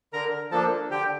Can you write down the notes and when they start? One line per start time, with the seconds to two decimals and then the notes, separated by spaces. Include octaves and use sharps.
0.13 D3 A#4 A#5
0.51 F3 A#3 D4 A4 A5
0.90 D3 G4 G5